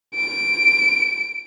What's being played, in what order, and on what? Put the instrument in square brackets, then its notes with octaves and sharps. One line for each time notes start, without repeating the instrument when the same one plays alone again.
[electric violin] D7